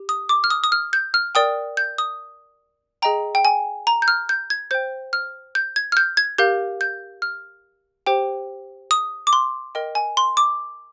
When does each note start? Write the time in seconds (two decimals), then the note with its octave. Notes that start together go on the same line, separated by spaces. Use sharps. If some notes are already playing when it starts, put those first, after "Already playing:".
Already playing: G4
0.09 D#6
0.29 D6
0.44 F6
0.50 D#6
0.64 D#6
0.72 F6
0.93 G6
1.14 F6
1.35 A#4 D5 G5 D#6
1.77 G6
1.98 D#6
3.02 G#4 D#5 G5 A#5
3.35 G5
3.45 G#5
3.87 A#5
4.02 G6
4.08 F6
4.29 G6
4.50 G#6
4.71 C5 G5 G6
5.13 F6
5.55 G6
5.76 G#6
5.92 F6
5.97 G6
6.17 G#6
6.38 G4 A#4 F5 G6
6.81 G6
7.22 F6
8.07 G4 C5 G5
8.91 D#6
9.27 D6
9.33 C6
9.75 A#4 D#5 G5
9.95 G#5
10.17 C6
10.37 D6